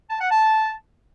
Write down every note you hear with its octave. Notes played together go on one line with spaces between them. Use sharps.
A5
F#5
A5